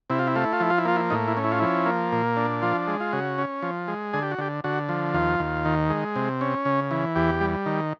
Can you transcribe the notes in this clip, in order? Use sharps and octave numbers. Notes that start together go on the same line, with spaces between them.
C3 E4
F4
E4
A3 F4
E4
F4
F3 E4
F4
E4
A#3 F4
E4
A2 D#4
E4
C#4
E4
F4
F3 E4
A#3
A#2
D4
F3 F4
G#3
F4
C#3 F#4
C#4
F3
G#3
D3 G#4
G4
F#4
D3 G4
D3 F#4
F3
D#2 F4
D#2
D#3
G#3
C3
C#4
C#3
E3
E2 G4
G3
D#3